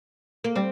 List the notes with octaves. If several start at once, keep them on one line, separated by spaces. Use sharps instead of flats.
A#3
G3 C4